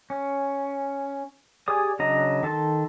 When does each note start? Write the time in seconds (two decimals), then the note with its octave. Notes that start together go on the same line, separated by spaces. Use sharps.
0.10 C#4
1.68 G4 G#4 D5 G#5 D#6
1.99 C#3 F#3 D4 D#5 A#5
2.43 D#3 A4 A5 C6